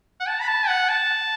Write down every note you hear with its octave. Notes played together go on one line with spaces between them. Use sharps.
F#5
A5
B5
A5
F#5
A5